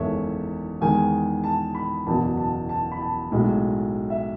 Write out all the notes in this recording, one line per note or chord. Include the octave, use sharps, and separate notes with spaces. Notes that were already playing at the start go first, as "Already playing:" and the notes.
Already playing: F#1 E2 D#3 G#3 A4 C#5 E5
E2 D#3 G#3 G#5
A5
B5
F#1 E2 B2 F#3 A5
A5
A5
B5
A5
B1 A2 G#3
E5